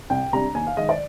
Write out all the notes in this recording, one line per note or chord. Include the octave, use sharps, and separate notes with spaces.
C2 G5
C3 G3 D4 A#5
D#2 G#5
F5
D#3 G#3 D#5
D5